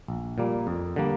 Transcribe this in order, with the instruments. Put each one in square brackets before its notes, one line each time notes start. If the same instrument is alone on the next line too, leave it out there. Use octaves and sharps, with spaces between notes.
[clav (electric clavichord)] A#1
A#2 G3 A#3
F2
D3 G3 A#3